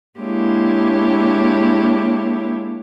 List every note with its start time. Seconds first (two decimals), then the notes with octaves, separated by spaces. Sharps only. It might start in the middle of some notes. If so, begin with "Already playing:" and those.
0.18 G#3 A#3 D4 E4 G4 C#5